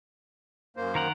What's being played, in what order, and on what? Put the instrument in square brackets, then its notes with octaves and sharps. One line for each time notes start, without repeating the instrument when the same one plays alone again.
[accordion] F#2 A#3 C5
[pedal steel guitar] D#3 A#4 F#5